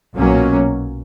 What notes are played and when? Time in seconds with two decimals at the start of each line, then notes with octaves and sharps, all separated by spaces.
0.15 B1 A#2 F#3 A#3 C#4